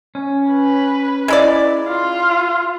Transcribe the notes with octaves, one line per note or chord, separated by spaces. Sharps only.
C#4
B4
G#3 E4 D5
F4